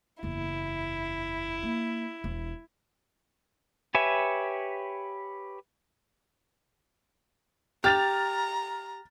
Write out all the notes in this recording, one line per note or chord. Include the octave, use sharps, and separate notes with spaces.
F#1 E2 E4
A#3
E1
G4 B4 C#5 E5 G#5
G4 A#5 F6 A6 F7